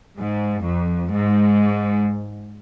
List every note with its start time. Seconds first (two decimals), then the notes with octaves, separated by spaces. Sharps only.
0.17 G#2
0.64 F2
1.11 G#2